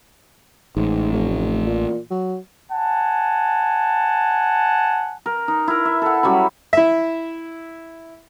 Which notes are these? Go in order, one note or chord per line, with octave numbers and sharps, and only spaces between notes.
A1 G#2
F1
A#2
F#3
F#5 G#5 A5
A#4
D#4
E4 A#4
E5
A4 F#5
F#3 G3 C#4 B5
E4 E5